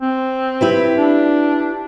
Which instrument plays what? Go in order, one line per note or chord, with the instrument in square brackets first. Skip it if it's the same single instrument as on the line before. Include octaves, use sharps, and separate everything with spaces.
[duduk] C4
[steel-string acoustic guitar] E4 G4 B4
[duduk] D4